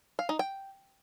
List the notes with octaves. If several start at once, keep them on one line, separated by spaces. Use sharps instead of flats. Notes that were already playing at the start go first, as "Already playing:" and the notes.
F5
D#4
G5